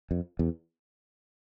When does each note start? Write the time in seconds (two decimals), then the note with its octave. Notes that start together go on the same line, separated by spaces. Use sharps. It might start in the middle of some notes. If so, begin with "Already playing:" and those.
0.11 F2
0.39 E2